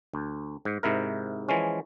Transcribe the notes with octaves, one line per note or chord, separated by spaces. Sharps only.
D2
G#2
G#2 C3 E4 A#4
E3 F3 G#3 C#4